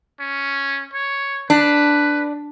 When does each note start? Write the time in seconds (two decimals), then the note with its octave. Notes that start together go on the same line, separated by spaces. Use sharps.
0.20 C#4
0.93 C#5
1.50 D4 B4